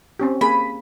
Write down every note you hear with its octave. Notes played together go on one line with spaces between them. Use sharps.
C4 C#4 G4
A#3 G#4 B5